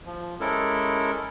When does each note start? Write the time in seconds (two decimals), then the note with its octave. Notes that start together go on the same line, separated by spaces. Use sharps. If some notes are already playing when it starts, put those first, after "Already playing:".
0.06 F3
0.41 G#3 C#4 E4 A4 A#4